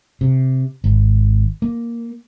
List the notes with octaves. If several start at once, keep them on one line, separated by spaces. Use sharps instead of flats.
C3
G#1
A#3